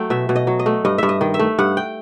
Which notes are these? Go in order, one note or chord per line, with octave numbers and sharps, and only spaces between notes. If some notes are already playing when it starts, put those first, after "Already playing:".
Already playing: F#3 A3 G5
B2 E5
B2
D#5
F#3
D#5
A3
G2 D#5
G2 E5
D#5
D#3
E5
A3
G2 F#5
G5